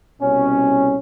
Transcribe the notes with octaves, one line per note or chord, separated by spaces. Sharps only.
C2 B2 C#4